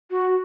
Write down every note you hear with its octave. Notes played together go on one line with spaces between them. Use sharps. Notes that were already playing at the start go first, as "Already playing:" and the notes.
F#4